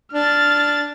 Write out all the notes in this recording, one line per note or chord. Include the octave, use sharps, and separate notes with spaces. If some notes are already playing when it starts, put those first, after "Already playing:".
D4 F6 A6